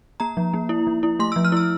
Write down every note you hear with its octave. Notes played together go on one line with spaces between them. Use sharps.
A#3 A#5
F3
A#3
E4
F3
E4
A3 C6
E6
F3
F6
E4 E6